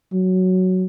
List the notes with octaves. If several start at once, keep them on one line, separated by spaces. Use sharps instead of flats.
F#3